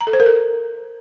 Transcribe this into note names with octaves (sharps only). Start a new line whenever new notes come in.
A#5
A4
C5
A#4
A4